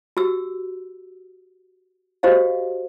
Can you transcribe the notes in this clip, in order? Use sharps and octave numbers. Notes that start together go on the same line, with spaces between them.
F#4 G4 E6
F#4 G4 C5 D#5 F5